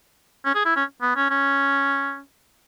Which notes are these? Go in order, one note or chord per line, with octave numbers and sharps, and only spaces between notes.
C#4
G#4
E4
C#4
B3
C#4
C#4